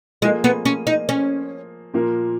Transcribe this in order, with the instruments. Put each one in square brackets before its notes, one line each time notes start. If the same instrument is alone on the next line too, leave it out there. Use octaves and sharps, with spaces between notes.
[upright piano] F3 A#3 F4 G#4 [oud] G#3
[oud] B3
C#4
D#4
C#4
[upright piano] A#2 F3 A#3 F4 A#4